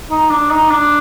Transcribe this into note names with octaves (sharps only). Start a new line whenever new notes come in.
D#4
D4
D#4
D4